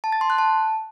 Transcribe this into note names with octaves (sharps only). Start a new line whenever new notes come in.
A5
A6
C6
F#6
A5